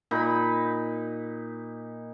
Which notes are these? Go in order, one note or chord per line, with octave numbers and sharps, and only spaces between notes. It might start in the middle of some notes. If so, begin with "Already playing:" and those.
A#2 D#4 B5